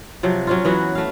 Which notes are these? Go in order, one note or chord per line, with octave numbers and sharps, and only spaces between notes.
C3 F3 F#3
F#3 C#4 F4
E3 F#3 B3 F#4
A3 F5